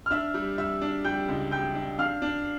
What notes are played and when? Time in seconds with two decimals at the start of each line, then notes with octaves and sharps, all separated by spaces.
0.06 F6
0.11 D4 E5 E6
0.34 G3
0.58 G3 E5 E6
0.81 D4
1.04 G3 G5 G6
1.28 C#2
1.51 G3 G5 G6
1.75 D4
1.99 D4 F5 F6
2.22 D4